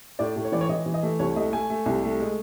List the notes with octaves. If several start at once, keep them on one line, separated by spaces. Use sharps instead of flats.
A2 D5
A2
C#5
E3 D5
C#5
E3 D#5
E3
D#5
A3
C2 C#5
A3 D#5
A3 G#5
A3
C2
A3
G#3